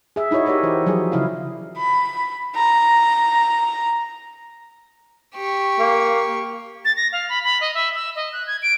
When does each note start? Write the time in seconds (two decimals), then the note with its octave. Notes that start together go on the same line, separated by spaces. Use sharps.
0.16 G#4 E5
0.31 D#4 E4 F#4 C#5 D#5
0.46 E4 G4 A#4 C#5 D5 E5
0.63 E3 C5
0.86 F3 F#3 F4 G#4
1.12 C#3 E4 F5
1.78 B5
2.56 A#5
5.35 G4 C#6
5.79 A#3
6.85 A6
6.96 A#6
7.12 F5
7.29 B5
7.44 B5
7.61 D#5
7.74 E5
7.95 E6
8.16 D#5
8.33 F#6
8.47 G#6
8.63 D7